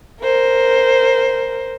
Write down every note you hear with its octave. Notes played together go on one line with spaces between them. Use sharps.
A#4 C5